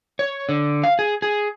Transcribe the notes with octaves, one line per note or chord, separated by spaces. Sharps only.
C#5
D3
F5
G#4
G#4